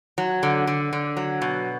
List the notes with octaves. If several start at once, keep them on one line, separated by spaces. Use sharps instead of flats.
F#3
D3
D3
D3
F#3
B2